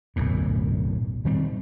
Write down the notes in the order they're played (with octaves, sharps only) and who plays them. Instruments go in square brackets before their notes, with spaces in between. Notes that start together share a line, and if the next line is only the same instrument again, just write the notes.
[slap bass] D1 B1 F#2 A2
D#3 G3 C4